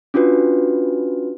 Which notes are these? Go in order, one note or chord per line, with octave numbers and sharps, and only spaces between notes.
C#4 D4 F4 F#4 B4